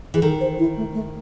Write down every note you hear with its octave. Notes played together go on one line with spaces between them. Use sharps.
E3 G#4
D#3 A4
C5
E4
A3
A3